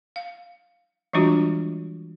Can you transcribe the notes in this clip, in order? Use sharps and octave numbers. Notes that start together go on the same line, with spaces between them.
F5
E3 G3 G#3 D4 F4 F#4